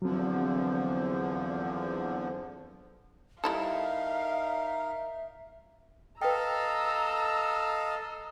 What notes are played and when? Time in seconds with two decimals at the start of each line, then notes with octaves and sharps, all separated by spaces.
0.02 E2 D3 F3 F#3 C4
3.44 G3 D#4 E4 A4 A#4 E5 F5
6.22 A4 B4 D#5 F5 G5 A#5 E6